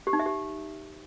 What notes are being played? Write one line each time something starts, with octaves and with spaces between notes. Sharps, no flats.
G4
D#4
E5
G4